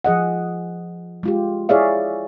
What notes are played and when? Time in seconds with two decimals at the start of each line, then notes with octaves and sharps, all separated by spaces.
0.04 F3 G#4 D#5 F#5
1.23 G#3 F4 G4
1.69 E4 G#4 C#5 D5 E5 F5